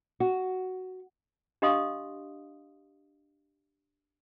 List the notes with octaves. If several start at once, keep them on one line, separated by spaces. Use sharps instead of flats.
F#4
D4 G4 D#5 F5 C6 D#6